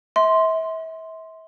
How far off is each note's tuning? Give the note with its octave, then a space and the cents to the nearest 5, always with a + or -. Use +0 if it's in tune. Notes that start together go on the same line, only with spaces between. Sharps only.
E5 -35 C6 +0